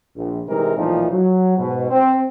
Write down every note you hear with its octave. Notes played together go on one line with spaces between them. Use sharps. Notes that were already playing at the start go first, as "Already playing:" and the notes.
A#1
C3 E3 G3 G#3 D#4 A#4
B1 A#2 E3 F3 A3 D#4
F#3
G#2 B2
C4